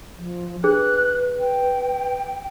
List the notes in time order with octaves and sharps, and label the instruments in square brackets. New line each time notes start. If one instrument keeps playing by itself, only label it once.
[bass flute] F3
[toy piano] D4 G#4 [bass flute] B4 [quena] F#6
[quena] G5